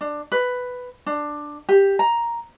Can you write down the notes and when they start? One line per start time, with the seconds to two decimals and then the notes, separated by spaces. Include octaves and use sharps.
0.01 D4
0.32 B4
1.06 D4
1.69 G4
1.99 A#5